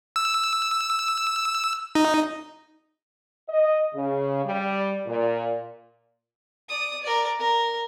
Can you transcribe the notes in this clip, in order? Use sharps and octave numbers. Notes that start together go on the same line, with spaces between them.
E6
D#4
D#5
C#3
G3
A#2
D5 D#6
A#4 D5
A#4